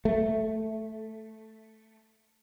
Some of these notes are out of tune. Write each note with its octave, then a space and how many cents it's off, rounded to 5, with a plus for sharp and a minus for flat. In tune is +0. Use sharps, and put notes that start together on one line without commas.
A3 +0